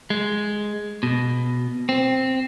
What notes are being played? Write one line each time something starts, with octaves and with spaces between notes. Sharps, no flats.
G#3
B2
C4